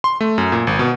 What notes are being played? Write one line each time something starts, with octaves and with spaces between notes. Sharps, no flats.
C6
A3
F#2
A#2
G#1
B2